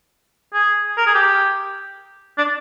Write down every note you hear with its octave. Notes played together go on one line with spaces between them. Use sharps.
G#4
A#4
G#4
G4
D4